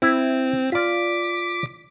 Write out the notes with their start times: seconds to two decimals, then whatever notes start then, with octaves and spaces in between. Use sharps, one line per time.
0.02 C4 E4
0.72 F4 D5 D6 B6